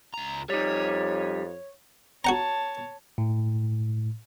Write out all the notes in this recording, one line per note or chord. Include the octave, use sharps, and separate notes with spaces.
C#2 A#5
F2 G3 D#4 C#5
F#4 C#5 F#5 A5 A#5
A2